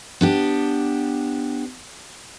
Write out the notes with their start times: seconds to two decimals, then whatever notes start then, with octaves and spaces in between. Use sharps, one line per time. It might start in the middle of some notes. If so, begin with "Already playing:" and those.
0.21 B3 D4 G4